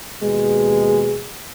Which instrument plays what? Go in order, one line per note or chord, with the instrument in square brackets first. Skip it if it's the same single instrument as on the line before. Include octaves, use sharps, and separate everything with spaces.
[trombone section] D#2 B2 G#3